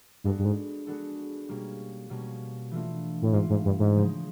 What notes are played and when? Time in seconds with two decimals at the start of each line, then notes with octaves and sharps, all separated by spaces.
0.24 G2 G#3 B3 D4 F#4 A4
0.39 G2
0.45 G#2
0.86 G#3 B3 D4 F#4 A4
1.48 B2 G3 A#3 C#4
2.10 B2 G3 A#3 C#4
2.71 E3 A3 D4 F4
3.22 A2
3.33 G#2 E3 A3 D4 F4
3.50 G#2
3.65 G2
3.80 G#2
3.96 C#3 F3 G#3